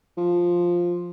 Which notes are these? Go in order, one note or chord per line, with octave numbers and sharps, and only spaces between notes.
F3